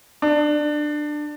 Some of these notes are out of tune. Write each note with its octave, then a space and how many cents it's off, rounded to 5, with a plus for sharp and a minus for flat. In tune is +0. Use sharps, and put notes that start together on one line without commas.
D4 +20